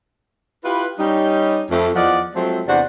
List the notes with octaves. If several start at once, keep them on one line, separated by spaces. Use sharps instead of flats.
E4 F4 G4 B4
G3 C#4 D#4
F2 A3
E2 F3 F4 D5 D#5 F#5
F3 F#3 G#3 A3 C4
E2 C3 D4 C5 D5 F#5